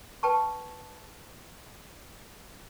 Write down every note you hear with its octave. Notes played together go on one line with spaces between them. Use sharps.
B4 G5 A5 C#6